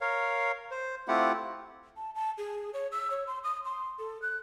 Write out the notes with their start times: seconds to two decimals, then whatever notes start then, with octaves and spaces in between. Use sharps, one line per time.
0.01 A#4 C#5 F5
0.71 C5
1.08 A3 C4 E4 F4 G4 F#5
1.97 A5
2.15 A5
2.38 G#4
2.74 C#5
2.92 E6
3.10 C#5
3.27 C6
3.44 D#6
3.65 C6
3.99 A4
4.22 F#6